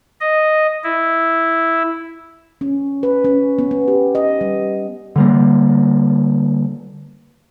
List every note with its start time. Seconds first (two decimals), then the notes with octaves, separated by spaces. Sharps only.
0.20 D#5
0.84 E4
2.61 C#4
3.03 B4
3.25 C#4
3.59 B3
3.71 B3
3.88 G4
4.15 D#5
4.41 G3
5.16 D3 G3 A#3